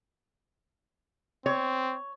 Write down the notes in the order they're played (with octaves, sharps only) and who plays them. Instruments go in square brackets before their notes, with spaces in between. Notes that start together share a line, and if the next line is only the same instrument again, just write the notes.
[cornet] C4 [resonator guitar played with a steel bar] C#5